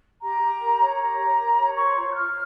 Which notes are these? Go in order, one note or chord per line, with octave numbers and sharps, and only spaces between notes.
G4 A#5
G4
A#4
C#5
G4 A#5
G4
A#4
C#5
C5 C#6
F4
G6
C5 F6